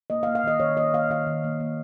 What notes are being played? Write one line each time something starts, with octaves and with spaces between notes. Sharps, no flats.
A#3 D#5
F5
A#3
F5
D#3 D#5
D#3 C#5
A#3 D#5
A#3 F5
D#3 F5
D#3
A#3
A#3